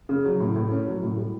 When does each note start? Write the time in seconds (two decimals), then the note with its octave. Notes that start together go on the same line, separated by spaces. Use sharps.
0.09 C#3
0.25 F#3
0.40 A2
0.56 A2
0.71 C#4
0.87 F#3
1.03 A2
1.17 G3